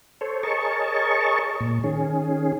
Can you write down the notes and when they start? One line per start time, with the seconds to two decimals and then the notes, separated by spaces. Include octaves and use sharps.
0.21 A4 C5 C#5
0.43 G#4 A#4 C#5 D#5 A5 C#6
1.61 A#2
1.84 D#3 C#4 G#4